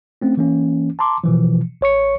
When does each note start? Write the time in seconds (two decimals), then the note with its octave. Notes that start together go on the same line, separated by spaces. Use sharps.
0.22 A3 C4 C#4
0.37 E3 A#3 C#4
0.99 A5 A#5 C6 D6
1.24 B2 E3 F3
1.81 A1 C#5 C#6 C#7